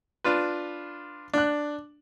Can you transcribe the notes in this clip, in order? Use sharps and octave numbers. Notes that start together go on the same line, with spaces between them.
D4 F4 B4
D4 F#6